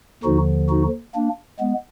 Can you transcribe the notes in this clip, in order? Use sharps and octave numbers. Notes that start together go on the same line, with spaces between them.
D#2 D3 F3 D#4 F#4
D#4 F#4
A#3 D4
G#3 B3